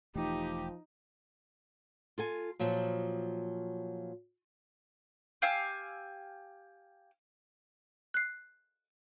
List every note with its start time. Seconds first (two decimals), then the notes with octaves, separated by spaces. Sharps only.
0.15 E1 E3 F3 A3 D#4 G4
2.18 F4 A4 G#5
2.59 A#2 F3 F#3
5.42 G4 F5 G#5 E6
8.14 F#6 C7